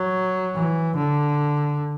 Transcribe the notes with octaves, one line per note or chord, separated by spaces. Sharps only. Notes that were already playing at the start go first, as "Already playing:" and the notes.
Already playing: F#3
E3
D3